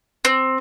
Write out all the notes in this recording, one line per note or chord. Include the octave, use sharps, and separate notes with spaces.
C4